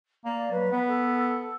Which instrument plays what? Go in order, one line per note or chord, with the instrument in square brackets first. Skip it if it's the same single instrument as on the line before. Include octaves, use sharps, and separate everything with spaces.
[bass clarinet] A#3 [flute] D5
[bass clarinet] F#3 [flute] B4
[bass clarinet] B3
[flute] A4